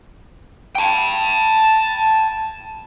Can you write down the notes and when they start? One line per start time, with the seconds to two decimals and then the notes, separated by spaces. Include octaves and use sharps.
0.75 G5 A5